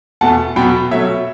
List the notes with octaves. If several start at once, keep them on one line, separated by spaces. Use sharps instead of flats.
E2 B2 A3 F#5 A5
E2 B2 F#3 B3 G5 B5
B2 F#3 A3 C#5 E5